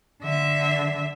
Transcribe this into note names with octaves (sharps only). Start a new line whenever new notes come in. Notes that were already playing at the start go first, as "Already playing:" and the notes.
D3 E5